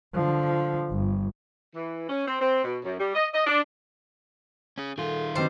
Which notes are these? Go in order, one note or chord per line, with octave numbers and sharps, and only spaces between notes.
D3 F3
G1
E3
C#4
C4
C4
B2
F#2
G3
D#5
D#5
D4
C#4 G#4
D#3 F4 G#4 A4
D3 D#3 G3 C4 F#4 B4 C5